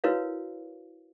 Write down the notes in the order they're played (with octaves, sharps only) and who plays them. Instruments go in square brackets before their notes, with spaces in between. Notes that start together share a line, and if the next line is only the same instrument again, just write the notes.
[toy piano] E4 F#4 A#4 B4 C#5 F5